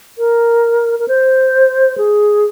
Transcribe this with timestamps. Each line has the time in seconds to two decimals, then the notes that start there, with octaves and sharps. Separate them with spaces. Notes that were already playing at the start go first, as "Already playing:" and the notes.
0.18 A#4
0.99 A#4
1.08 C5
1.98 G#4